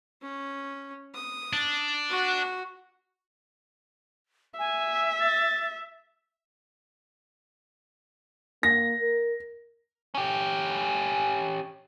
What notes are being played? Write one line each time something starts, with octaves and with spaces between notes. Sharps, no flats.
C#4
D#6
D4
F#4
E5 G#5
A6
A#3 A#6
A#4
C#4 G4